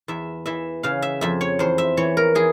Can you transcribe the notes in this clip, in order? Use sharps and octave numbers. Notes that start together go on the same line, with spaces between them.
E2 E5
E3 E5
C#3 F5
E5
F2 E5
C#5
E2 C5
E5
E3 C#5
A#4
E3 G#4